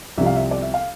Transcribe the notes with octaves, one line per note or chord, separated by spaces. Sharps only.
C2 C3 F3 E5
F5
E5
D5
E5
F5